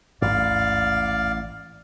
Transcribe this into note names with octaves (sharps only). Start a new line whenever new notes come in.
A1 D#2 G#2 D5 F5